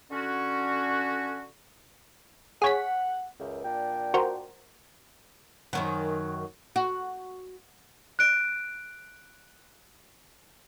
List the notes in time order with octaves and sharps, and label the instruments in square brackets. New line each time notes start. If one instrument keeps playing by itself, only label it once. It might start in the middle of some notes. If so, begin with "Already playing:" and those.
[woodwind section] D3 C#4 F#4
[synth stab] G#4 C#5 B6 [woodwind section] F#5
[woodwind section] C#2 F#2
A#2 D4 G5
[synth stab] F#4 A#4 C5
[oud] F#2 D#3 F#3
F#4
[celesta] F#6 D7